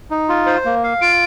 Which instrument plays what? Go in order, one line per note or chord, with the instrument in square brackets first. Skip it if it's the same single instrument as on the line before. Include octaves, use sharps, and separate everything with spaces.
[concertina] D#4
F4
C5
A#3
F5
[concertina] F4 [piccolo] D7